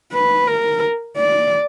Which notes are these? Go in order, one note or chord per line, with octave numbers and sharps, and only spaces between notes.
B4
A#4
D5